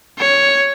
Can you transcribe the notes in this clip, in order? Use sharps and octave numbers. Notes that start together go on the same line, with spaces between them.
C#5